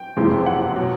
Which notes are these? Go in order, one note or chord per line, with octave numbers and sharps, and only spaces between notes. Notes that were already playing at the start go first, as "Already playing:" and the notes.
Already playing: G5
F#1 F2 C3 E3 G#3
F#5
B2 F#3